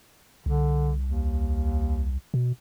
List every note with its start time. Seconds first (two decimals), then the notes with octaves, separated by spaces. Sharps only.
0.46 C2 D3
1.04 D#2
2.34 B2